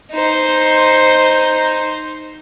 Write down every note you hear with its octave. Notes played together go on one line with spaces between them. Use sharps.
D#4 C5